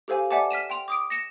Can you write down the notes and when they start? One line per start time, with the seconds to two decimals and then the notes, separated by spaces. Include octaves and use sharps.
0.08 G4 A4 C5 F5 G#5
0.31 D5 E5 F#5 G#5 A5 D6
0.51 F6 B6 D#7 E7
0.70 G5 C6 F7
0.88 D6 D#6 D7
1.10 A#6 C#7 E7